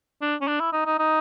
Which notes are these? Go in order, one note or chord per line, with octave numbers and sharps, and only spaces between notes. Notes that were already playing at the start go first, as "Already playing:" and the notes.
D4
C#4
D4
E4
D#4
D#4
D#4